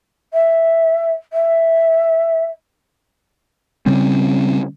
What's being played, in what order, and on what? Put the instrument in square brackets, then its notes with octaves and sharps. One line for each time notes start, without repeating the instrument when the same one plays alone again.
[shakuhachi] E5
E5
[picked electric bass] C#3 G3 C4 C#4